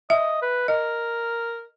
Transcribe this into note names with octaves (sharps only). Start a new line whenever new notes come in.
D#5 E5
B4
A#4 D#5